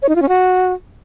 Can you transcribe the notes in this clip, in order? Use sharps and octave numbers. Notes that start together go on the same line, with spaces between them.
C#5
D#4
F4
C#4
F#4